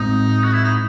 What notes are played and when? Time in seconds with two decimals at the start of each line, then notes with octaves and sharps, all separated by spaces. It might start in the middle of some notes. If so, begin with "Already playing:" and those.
Already playing: A2 G#3 C4 D#4
0.43 F#4
0.53 E4
0.64 D#4